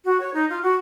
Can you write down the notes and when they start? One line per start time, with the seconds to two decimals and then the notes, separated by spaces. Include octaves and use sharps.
0.05 F#4
0.20 C#5
0.34 D#4
0.50 F4
0.63 F#4